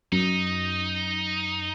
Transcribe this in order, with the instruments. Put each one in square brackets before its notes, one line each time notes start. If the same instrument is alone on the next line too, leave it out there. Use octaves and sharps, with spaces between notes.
[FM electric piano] F#2 [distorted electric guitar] D#4